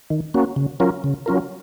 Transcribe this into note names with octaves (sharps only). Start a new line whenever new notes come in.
D#3
A#3 C#4 F#4
C#3
F#3 C#4 F4 A#4
C#3
F#3 C#4 F4 A#4